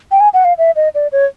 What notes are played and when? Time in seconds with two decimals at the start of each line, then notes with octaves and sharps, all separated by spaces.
0.11 G5
0.20 G#5
0.33 F#5
0.44 F5
0.58 E5
0.76 D#5
0.94 D5
1.12 C#5